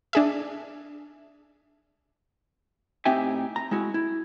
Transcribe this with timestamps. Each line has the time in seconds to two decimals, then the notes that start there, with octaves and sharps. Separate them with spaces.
0.13 D4 G#4 E5
3.05 A2 C4 D#4 G4 E5 G#5
3.56 A#5
3.71 G#3 E4 F#4
3.94 E4